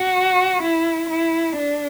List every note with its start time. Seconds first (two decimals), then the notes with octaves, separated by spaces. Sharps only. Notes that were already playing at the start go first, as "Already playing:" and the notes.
Already playing: F#4
0.62 E4
1.10 E4
1.58 D4